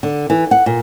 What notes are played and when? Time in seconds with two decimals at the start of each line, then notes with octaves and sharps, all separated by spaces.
0.03 D3
0.30 E3
0.51 F#5
0.66 A#2